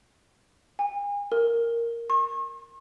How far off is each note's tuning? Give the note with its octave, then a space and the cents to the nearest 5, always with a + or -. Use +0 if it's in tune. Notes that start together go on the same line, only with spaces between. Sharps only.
G#5 -35
A#4 -5
C#6 -45